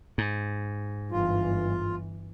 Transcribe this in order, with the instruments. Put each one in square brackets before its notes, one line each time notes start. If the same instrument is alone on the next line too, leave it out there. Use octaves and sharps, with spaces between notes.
[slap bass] G#2
[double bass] G1 E3 [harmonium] F4